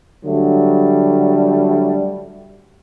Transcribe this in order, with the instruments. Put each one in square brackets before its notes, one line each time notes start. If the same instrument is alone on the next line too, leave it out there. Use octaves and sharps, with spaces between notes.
[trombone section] D3 F#3 G3 A3